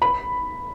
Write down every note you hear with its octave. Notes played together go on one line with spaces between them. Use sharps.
B5